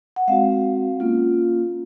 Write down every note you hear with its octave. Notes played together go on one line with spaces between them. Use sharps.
F#5
G#3 C4 F#4 F5
A#3 C#4 F4